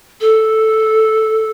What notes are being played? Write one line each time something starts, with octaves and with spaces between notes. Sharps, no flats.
A4